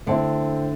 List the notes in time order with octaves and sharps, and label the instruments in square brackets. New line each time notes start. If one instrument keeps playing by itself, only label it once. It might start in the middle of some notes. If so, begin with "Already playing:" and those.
[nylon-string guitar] D3 [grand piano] A3 C4 E4